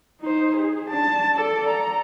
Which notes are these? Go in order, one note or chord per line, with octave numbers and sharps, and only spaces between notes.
D#4 C5
G#4
D4 A5
A4 D5
A#5